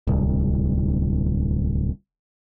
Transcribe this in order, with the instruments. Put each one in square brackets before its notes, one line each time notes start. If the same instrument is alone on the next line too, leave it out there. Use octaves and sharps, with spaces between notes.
[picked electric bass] D1 C2